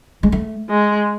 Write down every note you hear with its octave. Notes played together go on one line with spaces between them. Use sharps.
G#3
A3
G#3